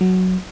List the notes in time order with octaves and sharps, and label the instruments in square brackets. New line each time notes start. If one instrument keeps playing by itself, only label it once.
[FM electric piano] F#3